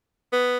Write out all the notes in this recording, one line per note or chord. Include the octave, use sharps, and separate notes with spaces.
B3